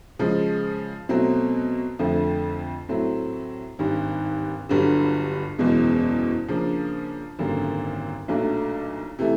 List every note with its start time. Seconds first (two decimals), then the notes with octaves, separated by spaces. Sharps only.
0.19 C#3 F3 G#3
1.09 B2 F#3 A3 C4
1.99 F2 D3 F3 A3
2.89 A2 F#3 A3 C4
3.79 G#1 G2 D#3
4.69 G1 G2 D3 F#3
5.58 F#1 E2 B2 G#3
6.48 C#3 F3 A#3 D4
7.39 G#1 F#2 D3 G3 A#3
8.28 B1 A#2 F#3 A3 D4
9.19 C3 E3 A3